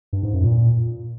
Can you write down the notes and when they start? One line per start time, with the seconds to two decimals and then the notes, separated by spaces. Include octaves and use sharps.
0.13 G2
0.23 G#2
0.34 F#2
0.44 A#2